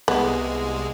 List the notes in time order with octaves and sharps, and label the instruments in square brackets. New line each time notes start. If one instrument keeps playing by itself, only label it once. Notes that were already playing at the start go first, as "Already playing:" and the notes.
[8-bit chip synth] C2 G#3 [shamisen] B3